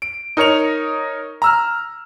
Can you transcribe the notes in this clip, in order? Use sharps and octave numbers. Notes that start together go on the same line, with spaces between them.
D7
D#4 A#4 C#5 C#7 F7
A#5 E6 F6